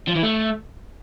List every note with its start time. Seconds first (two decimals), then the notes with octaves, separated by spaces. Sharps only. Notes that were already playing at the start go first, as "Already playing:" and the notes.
0.08 F3
0.15 E3
0.23 A3